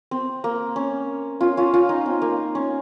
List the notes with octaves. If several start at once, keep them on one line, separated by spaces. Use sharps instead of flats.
C4
A#3
C#4
C#4 F4
C#4 F4
C#4 F4
D#4
C4
A#3
C#4